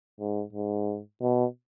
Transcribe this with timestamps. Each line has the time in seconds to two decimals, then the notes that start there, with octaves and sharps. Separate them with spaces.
0.20 G#2
0.53 G#2
1.21 B2